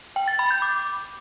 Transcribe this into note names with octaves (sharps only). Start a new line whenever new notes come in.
G5
A6
B5
G6
D6